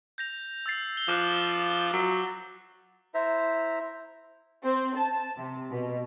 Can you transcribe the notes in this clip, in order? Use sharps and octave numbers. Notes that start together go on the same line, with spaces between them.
G6 A#6 F7
E6 A6 C7
G7
F3 D6 E6 F#6
F#3
E4 C5 E5 A#5
C4
A5
C3
B2